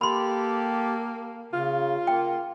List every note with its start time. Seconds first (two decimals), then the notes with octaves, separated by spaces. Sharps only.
0.01 A#3 G4 A4 B5 C6
1.53 C#3 F4
2.07 A#3 G5